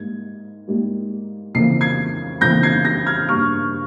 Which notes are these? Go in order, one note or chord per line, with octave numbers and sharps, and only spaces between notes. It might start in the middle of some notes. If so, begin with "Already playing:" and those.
Already playing: G#2 G3 A#3 G#6
G#2 G3 A#3
F2 C#3 E3 A#3 C7
G#6 C7
F2 C#3 E3 A#3 G6 A#6
G#6 C7
G6 A#6
F6 G#6
G2 G3 A#3 C#6 F6